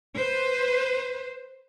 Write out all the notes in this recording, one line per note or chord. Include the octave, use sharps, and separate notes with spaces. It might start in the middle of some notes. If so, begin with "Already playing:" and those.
B4 C5